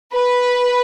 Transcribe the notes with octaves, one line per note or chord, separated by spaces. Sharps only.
B4